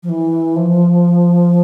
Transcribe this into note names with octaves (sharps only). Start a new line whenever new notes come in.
F3
E3
F3